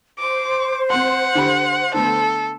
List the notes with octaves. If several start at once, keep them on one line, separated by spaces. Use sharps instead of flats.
C5 D6
C4 F#5 C6
D3 G4 B5
D3 A3 B3 A4